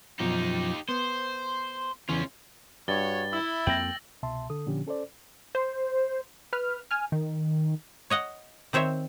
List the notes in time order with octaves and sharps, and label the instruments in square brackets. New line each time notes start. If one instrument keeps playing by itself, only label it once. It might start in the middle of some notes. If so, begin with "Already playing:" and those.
[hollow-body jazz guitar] F#2 B2 F3 [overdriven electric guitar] D#4 G4
[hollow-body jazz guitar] B3 [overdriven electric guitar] C5
[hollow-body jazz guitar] E2 C#3 E3 [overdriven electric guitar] C#4 F4
[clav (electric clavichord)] G2 [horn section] F#4 C#5 [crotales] A6 G7
[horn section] E4 [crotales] E6
[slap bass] F2 A#3 C4 [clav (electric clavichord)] G5 [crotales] A#6 F#7
[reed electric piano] C2 B2 E5 A5 C6
D3 A4 D#6
A#2 D3 F3 C#4 G4
C#4 A4 C5 D5
[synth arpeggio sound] C5
B4 F6
G#5 F6
D#3
[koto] C#5 D#5 F#5
D#3 C4 C5 C#5 E5